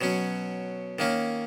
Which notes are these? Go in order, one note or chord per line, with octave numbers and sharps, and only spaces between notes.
B2 F#3 C#4
D#3 A#3 C#4